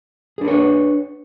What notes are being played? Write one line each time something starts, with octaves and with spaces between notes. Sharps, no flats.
D4 G#4 A#4 B4 C#5